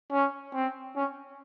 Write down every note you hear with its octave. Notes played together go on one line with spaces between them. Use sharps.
C#4
C4
C#4